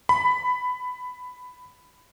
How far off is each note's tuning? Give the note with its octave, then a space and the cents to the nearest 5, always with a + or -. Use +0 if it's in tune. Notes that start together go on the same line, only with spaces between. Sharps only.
B5 +15